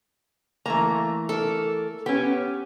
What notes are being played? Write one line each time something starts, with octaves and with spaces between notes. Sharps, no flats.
E3 A3 A#3 A#5
A4 A#4
B3 C#4 G4